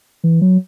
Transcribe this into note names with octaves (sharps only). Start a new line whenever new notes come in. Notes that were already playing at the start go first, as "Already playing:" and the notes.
E3
F#3